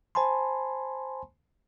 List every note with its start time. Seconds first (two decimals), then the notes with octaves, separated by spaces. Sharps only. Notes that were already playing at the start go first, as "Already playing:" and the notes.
0.15 C5 G#5 A5 B5 C6